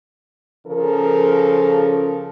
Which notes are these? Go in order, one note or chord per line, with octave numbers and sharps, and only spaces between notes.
C#3 F3 A4 A#4